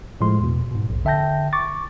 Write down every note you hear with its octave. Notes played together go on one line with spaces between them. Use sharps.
A2 F3 G#3 C6
E2 B2
G#2 B2
A#1 E2
D3 E5 G5 A5 G6 A#6
C#6 D6 A6